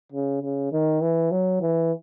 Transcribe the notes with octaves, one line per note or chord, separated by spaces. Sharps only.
C#3
C#3
D#3
E3
F#3
E3